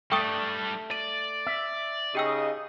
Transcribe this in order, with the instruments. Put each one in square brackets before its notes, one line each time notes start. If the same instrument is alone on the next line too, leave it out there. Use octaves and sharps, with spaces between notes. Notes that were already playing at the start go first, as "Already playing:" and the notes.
[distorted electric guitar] G3 D4 [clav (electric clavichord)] A3 [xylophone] G5 C#6 D#6
[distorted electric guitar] D5 [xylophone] D#7
[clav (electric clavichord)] E5
[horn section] C#3 D#4 D#5 [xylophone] G4 G5 E6